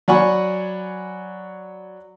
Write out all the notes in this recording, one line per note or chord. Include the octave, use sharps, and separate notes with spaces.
F#3 D5 F#5 G#5 B5 C#6